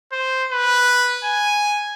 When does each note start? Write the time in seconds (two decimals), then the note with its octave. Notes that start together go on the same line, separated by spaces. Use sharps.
0.12 C5
0.52 B4
1.25 G#5